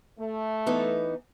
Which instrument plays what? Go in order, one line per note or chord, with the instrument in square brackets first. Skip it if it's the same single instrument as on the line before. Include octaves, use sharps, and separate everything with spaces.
[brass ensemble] A3
[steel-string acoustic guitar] E3 B3 D#4